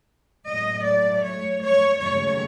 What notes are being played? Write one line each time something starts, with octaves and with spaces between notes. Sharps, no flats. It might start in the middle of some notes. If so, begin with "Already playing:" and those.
A2 F#3 A3 D#5
D5
C#5
C#5
D#2 C#3 F#3 A3 C#5